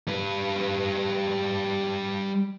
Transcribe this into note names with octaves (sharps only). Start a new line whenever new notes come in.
G3 B4